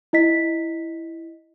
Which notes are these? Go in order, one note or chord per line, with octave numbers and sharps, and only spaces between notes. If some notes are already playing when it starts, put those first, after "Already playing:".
E4 D#5 B6